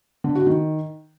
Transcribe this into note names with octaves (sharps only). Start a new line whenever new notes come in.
D3
F#4
D#3